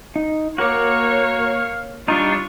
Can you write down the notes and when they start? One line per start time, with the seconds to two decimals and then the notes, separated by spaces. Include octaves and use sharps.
0.16 D#4
0.58 A#3 F#4 A#4 C#5 F5 D6
2.08 G3 D4 D#4 F4 C#6